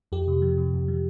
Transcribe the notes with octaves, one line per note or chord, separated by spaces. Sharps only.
F2 G4
C3
F3
C3
F2
F3